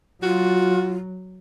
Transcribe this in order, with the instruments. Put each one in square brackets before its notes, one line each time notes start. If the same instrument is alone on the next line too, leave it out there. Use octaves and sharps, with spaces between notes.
[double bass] F#3 [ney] F4 [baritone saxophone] F#4